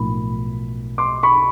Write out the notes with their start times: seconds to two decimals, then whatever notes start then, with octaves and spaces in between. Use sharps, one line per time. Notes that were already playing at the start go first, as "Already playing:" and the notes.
Already playing: B1 A2 F3 A#3 B5
0.98 C6 D6
1.23 B5 C#6